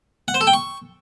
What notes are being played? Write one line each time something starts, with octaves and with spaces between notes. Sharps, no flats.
F#5
C5
A4
G5
C#6